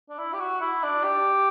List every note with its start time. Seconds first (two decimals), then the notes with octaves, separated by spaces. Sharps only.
0.09 D4
0.18 E4
0.33 G4
0.39 F#4
0.60 E4
0.83 D4
1.03 G4